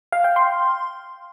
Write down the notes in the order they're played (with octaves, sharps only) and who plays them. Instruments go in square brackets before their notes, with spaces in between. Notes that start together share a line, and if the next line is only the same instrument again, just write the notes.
[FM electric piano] F5
G5
C6